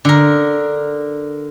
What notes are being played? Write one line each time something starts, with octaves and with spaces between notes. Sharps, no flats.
D3 A#4